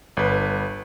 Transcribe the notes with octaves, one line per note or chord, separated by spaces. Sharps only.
G1 B4